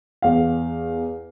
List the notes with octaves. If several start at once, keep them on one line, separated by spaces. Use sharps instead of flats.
E2 F5